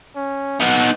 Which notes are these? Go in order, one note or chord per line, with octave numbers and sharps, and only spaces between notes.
C#4
B3 D#4 F#5